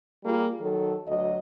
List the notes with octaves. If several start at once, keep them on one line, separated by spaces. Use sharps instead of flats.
G3 A#3 F4 G#4
D#3 F#3 A4
D2 F#3 D#5